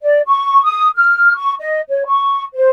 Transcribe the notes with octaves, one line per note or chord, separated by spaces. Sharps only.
D5
C#6
D#6
F6
C#6
D#5
C#5
C#6
C5